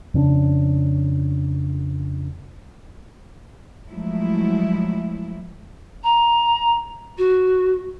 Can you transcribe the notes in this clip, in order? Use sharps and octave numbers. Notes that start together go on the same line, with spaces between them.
F2 C#3 C#4 D4
F3 F#3 G#3 A3 E4
A#5
F#4